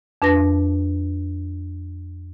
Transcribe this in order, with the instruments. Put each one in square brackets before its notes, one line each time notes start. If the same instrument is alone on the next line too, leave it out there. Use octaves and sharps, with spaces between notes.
[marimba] F2 D4 B4 A5 A#6